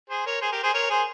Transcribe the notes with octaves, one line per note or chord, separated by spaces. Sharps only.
G#4 C5
A#4 C#5
G#4 C5
G4 A#4
G#4 C5
A#4 C#5
G#4 C5